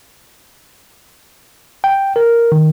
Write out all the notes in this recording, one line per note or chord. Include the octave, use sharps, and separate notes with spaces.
G5
A#4
D#3